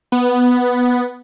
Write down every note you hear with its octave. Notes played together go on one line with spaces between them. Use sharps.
B3